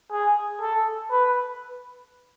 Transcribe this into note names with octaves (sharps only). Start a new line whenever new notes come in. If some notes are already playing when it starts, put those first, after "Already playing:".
G#4
A4
B4